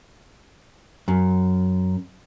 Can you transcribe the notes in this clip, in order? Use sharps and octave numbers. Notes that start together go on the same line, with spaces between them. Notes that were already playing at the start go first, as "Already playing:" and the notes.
F#2